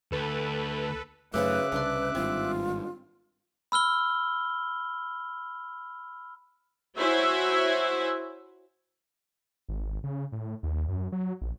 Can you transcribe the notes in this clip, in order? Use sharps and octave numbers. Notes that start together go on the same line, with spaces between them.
D2 A4 B4
F#2 C#3 A3 B4 C5 E5 D6 F#6
C2 C#3 D4 B4 C6
G#1 G2 C4 F4
B5 E6 F6 G7
E4 F#4 C5 C#5 E5 G#5
G#1
C#3
A2
D#2
F#2
F#3
A#1